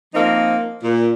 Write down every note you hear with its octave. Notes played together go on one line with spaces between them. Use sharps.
F3 A#3 C4 D#4
A#2